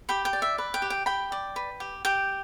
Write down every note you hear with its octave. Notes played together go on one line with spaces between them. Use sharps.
G4 G5 B5
G5
D5
E5
B4
G5
G4
G5
G4 G5 B5
D5
B4
G4
G4 G5